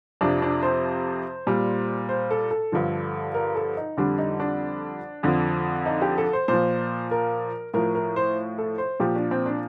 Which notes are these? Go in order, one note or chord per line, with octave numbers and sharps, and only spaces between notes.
F2 C3 F3 D4
D4
C5
A#2 G3
C5
A4
A4
G2 D3 F3
A#4
A4
D#4
F2 D3 G3 D4
D#4
D4
F2 D3 F3
D#4
G4
A4
C5
A#2 C5
F3
A#4
A2 F3 A#4
A#4
C5
A4
C5
A#2 F3 G4
D4
C4
D4